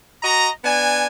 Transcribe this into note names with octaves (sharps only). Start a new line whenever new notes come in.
F#4 D#5 A#5
B3 D4 G#5